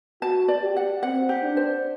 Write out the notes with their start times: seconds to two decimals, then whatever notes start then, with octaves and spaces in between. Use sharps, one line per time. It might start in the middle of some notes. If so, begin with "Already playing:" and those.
0.22 F#4 A5
0.48 D5
0.63 G4
0.76 F#5
1.03 C4 F#5
1.29 G4
1.43 D4
1.57 C5